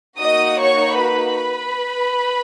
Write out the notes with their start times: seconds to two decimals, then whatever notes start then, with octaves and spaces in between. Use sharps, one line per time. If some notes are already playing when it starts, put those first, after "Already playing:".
0.20 A#3 D#4 F#4 D#5 D#6
0.60 C#5 C#6
1.00 B4 B5